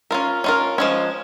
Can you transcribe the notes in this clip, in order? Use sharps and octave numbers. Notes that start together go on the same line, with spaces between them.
C#4 F4 A#4
C#4 F4 A#4
F3 G#3 C#4